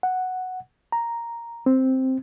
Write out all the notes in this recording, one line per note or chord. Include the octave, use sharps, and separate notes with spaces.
F#5
A#5
C4